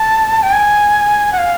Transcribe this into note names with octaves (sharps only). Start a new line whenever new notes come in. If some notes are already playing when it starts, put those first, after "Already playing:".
Already playing: A5
G5
G#5
F#5
F5